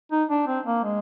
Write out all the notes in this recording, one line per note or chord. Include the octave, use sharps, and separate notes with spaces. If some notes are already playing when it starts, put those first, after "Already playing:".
D#4
D4
C4
A#3
G#3